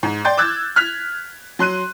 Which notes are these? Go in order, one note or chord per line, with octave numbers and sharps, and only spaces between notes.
G#2
D5 G5 C6 G6 A6
D6 E6 F#6 G#6 A6
F6 F#6 G#6 B6 F7
F#3 C6 F#6 D#7